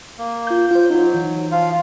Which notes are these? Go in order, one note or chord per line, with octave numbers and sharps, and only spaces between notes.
A#3
F4 G6
F4 C5 G6
F#3 D#4 F4
E3
F3 F4 F5